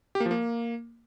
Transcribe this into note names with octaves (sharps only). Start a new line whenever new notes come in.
G4
A#3
F3
A#3